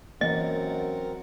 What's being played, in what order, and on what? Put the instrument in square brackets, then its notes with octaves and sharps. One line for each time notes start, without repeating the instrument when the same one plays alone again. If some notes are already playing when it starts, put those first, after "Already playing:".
[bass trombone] F#2 [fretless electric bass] E3 A#3 [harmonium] C4 A#4 F#5 [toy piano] D#5